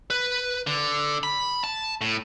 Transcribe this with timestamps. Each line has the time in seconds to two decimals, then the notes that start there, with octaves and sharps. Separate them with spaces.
0.10 B4
0.67 D3
1.23 B5
1.64 A5
2.01 A2